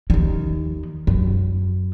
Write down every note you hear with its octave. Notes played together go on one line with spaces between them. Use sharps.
D#2 D#3
F#2